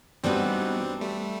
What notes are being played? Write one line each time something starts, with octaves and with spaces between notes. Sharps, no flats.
E3 G3 B3 C4 D4 D#4 F#4
G3 A3